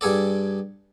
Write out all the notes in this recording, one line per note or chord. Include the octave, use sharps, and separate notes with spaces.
G2 G#4 A4 D5